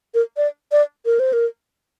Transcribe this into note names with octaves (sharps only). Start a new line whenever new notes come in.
A#4
D5
D5
A#4
C5
A#4